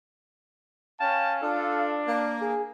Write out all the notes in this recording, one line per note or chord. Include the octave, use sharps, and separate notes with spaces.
C#4 F5 G5 A5
D4 F4 A4
A#3
G#4